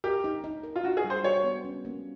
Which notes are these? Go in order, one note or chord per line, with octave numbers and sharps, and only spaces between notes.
G4 A#4
D#4
D#4
A#4
F4
D4 F#4
G#4
G3
C5
F#4 C#5
B3
C#4
A#3